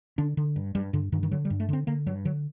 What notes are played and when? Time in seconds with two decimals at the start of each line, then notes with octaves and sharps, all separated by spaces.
0.18 D3 D4
0.37 D3
0.56 G2
0.75 G2 G3
0.93 G2 D3
1.12 G2 D#3
1.23 D#3
1.31 D3 F#3
1.45 G3
1.50 G2
1.60 A3
1.69 D3 C4
1.87 D3 A#3
2.06 G2 F#3
2.25 D3 F#3